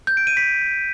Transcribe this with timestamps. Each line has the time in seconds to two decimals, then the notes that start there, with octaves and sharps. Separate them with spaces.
0.07 G6
0.17 D7
0.27 D#7
0.37 B6